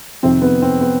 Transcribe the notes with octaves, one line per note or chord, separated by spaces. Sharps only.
F2 C3 D#3 C4
B3
C4
B3